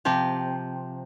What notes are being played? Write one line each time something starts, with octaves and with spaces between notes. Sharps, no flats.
C3 F3 G4